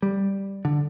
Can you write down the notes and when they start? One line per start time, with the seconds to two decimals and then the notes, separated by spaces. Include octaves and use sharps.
0.02 G3
0.65 D3